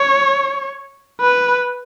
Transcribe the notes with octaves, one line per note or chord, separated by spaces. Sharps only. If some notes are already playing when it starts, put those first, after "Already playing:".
Already playing: C#5
B4